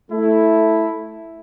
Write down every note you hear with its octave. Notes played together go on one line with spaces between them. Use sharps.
A3 E4